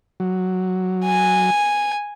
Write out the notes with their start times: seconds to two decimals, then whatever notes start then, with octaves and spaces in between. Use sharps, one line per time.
0.20 F#3
1.05 G#5